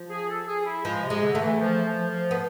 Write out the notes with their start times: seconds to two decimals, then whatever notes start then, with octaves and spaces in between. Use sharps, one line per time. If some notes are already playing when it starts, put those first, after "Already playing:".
Already playing: F3
0.10 G#4
0.29 A4
0.47 G#4
0.66 E4
0.84 F3 G#3
1.03 C3
1.10 G#3
1.23 D3
1.35 A3
1.41 E3
1.60 F3
1.85 F3
2.10 F3
2.31 B3